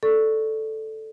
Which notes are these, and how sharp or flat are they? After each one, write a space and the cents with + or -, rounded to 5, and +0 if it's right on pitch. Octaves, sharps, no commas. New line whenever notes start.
A4 +0 D5 +0 C#6 +0